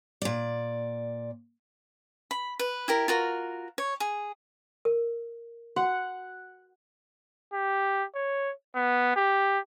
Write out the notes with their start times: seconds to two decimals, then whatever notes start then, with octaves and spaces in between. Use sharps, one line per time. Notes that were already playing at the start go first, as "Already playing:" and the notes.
0.22 A#2 D5
2.31 B5
2.59 B4
2.88 E4 G4 A#4
3.08 F4 F#4 A#4
3.78 C#5
4.00 G#4
4.85 A#4
5.76 F#4 F#5
7.53 G4
8.15 C#5
8.75 B3
9.16 G4